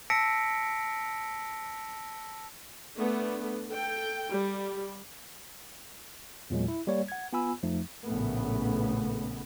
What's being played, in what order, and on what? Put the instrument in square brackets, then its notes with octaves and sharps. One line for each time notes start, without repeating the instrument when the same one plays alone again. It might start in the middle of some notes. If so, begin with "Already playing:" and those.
[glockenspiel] A5 E6 A#6 B6 C#7 D7
[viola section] A3 B3 D4
A4 G5
G3
[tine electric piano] E2 A#2 F#3 G#3
E4
G3 A#3 C#5 D5 F5
F#5 G#6
B3 F4 G#5 B5 E6
F2 F3 A3 D#4
[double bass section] A#1 A2 C#3 A3 B3